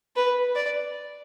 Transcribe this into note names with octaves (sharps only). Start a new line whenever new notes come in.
B4
D5